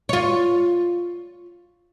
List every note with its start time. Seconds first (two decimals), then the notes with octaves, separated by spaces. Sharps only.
0.09 F4 C#5